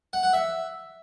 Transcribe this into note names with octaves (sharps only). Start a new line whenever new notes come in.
F#5
F#5
E5